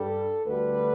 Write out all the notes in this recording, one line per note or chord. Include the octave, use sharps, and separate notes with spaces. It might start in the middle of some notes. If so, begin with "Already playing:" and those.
Already playing: G2 G3 A4
D2 D3 G3 B4